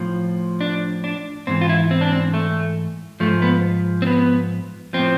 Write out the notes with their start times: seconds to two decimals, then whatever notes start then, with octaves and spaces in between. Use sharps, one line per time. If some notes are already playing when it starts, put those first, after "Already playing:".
Already playing: A2 F3
0.61 D4
1.04 D4
1.47 G#2 E3 C4
1.61 F4
1.69 E4
1.91 C4
2.01 D4
2.12 C4
2.34 A3
3.20 G#2 F3 A3
3.42 B3
4.02 C4
4.07 B3
4.93 A2 F3 C4